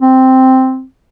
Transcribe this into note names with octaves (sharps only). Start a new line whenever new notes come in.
C4